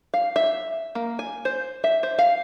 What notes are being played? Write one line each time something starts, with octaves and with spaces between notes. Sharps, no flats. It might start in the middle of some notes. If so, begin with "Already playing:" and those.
F5
E5
A#3
G#5
C5
E5
C5
F5